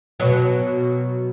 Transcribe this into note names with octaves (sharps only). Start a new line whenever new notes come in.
B2 F#3